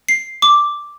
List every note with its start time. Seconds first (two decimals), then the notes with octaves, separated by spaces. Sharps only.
0.09 C7
0.42 D6